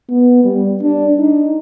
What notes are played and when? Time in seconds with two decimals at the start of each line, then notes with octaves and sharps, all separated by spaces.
0.10 B3
0.45 G3
0.82 D4
1.19 D#4